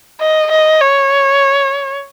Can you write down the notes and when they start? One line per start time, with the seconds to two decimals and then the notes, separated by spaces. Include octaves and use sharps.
0.20 D#5
0.51 D#5
0.81 C#5